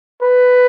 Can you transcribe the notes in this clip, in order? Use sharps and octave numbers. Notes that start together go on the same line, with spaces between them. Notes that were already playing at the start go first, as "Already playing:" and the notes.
B4